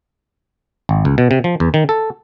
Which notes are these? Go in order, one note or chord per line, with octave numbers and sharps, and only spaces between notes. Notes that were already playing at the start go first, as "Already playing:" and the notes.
G#1
C#2
B2
C3
F3
E2
D#3
A4